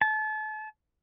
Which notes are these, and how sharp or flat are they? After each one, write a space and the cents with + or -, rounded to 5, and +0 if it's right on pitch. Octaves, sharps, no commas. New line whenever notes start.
A5 -35